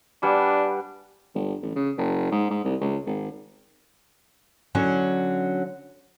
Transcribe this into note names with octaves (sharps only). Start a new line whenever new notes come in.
G3 D4 B4 F#5 G#5
G1
A1
C#3
F#1
G#2
G#2
C2
C#2
G#1
D3 F#3 C#4